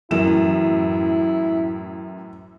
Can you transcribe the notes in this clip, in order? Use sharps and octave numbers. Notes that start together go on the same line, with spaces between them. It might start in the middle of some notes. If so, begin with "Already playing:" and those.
F#2 A2 E3 E4 E7